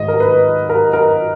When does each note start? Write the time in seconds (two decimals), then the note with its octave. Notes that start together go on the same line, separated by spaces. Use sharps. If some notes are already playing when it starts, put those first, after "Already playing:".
Already playing: G#2 D#3 G#3 D#5
0.08 A#4
0.20 B4
0.69 A#4
0.93 A#4